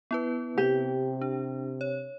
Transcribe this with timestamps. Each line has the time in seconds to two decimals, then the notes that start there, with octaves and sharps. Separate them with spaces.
0.11 B3 E4 B4
0.58 C3 G4
1.21 D4
1.81 C#5